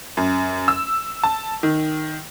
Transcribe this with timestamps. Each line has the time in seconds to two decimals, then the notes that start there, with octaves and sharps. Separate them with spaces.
0.17 F#2
0.68 E6
1.23 A5
1.63 D#3